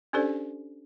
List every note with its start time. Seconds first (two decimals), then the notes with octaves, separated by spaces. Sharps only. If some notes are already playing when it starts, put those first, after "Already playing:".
0.13 C#4 D4 G4 A4 C5 D5